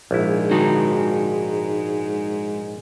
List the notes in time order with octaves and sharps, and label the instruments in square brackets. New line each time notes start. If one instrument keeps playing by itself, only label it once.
[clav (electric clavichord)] A#1 E4 [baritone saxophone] G#2
[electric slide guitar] G#3 D#4 F#4